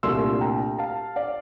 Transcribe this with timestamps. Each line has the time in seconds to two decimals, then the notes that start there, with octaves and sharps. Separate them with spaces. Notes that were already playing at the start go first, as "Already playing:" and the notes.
0.03 C2 A#2 A3 D4 C6 E6
0.41 G5 A#5
0.79 F5 A5
1.16 D5 F5